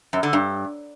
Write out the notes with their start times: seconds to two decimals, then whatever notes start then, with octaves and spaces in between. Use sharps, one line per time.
0.13 F#2
0.23 D3
0.33 G2